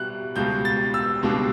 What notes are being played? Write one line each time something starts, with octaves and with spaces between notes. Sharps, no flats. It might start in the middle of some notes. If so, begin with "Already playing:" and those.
Already playing: B2 G3 E4 F#6
C#2 B2 G3 G6
A6
E6
C#2 B2 G3 D4